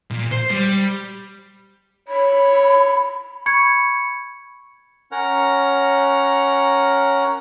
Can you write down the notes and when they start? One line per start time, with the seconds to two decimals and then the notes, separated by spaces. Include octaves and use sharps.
0.10 A#2
0.32 C5
0.51 G3
2.08 C#5 B5
3.46 B5 C#6 G#6 C#7
5.12 C#4 A#4 C#5 F#5 A#5